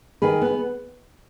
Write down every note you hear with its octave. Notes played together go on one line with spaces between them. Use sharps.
D#3 G#4 B4
B3